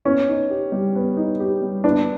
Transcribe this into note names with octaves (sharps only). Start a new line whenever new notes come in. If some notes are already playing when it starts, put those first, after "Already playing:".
B3 C#4
D#4
G4
G3
B3
D#4
G4
G3
B3 D4